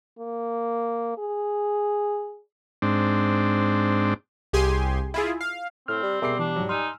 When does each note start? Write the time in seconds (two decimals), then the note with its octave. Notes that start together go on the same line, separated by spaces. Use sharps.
0.19 A#3
1.18 G#4
2.82 G#2 C4 D4
4.53 C2 G4 G#4 G#5 C6
5.14 E4 F4 G#4
5.41 F5
5.88 A2 C4 F6
6.03 G3
6.22 B2 G3 G#4 A#4 E5 D6 C7
6.39 E3 D4
6.56 G#2 F#3
6.69 D#4 G#5 C6 E6 F6